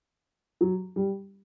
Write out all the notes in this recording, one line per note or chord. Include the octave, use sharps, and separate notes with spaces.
F#3
G3